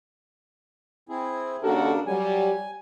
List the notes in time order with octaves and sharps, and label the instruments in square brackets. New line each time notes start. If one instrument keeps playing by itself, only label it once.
[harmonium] C4 E4 G#4
[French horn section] D#2 F#4 A4 [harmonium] C#3 D4 A#4
[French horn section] F#3 G3 [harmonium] G#5